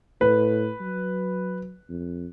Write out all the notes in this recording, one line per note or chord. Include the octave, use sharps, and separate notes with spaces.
A2 B4
F#3
F2